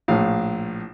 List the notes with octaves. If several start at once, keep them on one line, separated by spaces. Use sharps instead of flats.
A#1 A2 F5